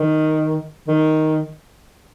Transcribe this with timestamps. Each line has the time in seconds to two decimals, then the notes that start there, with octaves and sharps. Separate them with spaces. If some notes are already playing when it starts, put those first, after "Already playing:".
Already playing: D#3
0.88 D#3